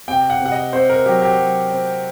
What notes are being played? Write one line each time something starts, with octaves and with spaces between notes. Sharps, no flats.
C3 G5
F#5
C3
F#5
D#5
C3 C5
A#4
F#3 G4
G4
F#3
C4